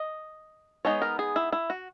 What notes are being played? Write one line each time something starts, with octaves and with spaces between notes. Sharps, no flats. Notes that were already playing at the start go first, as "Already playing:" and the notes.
Already playing: D#5
G#3 B3 D#4 C#5
A#4
G#4
E4
E4
F#4